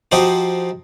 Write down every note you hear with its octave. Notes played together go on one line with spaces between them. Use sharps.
F3 D#4 F#4 G4 C5